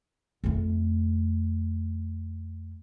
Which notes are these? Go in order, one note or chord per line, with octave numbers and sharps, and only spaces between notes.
F2 A3